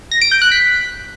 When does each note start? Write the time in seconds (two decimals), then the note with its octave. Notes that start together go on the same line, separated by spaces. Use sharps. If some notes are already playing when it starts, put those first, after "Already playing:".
0.11 A#6
0.21 D7
0.32 G6
0.42 F#6
0.52 B6